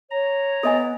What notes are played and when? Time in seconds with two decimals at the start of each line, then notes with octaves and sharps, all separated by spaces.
0.11 C#5 A#5
0.63 B3 A4 D#5 G#5